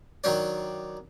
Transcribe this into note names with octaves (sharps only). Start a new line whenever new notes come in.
D#3 F#3 D4 D5